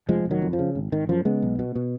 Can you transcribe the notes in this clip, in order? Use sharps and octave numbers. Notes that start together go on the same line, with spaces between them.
F1 F3 G#3
F1
D#3 F#3
F2
F3
C#3
G#1
G#1 D#3
F#2 F3
C#3 G#3 B3
B1
B2
B2